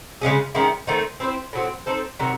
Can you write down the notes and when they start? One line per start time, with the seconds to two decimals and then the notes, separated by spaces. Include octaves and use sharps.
0.21 C#3 G#3 C#4 G#4
0.55 D#3 G#3 C#4 E4
0.87 D#3 A3 C4 D#4
1.20 C4 E4 G#4 C5
1.53 A2 F#3 C4
1.86 C4 D#4 A4 C5
2.19 C3 D#3 F#3